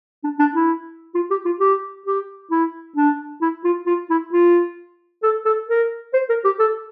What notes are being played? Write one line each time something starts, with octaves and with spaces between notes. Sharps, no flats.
D4
D4
E4
F4
G4
F4
G4
G4
E4
D4
E4
F4
F4
E4
F4
A4
A4
A#4
C5
A#4
G4
A4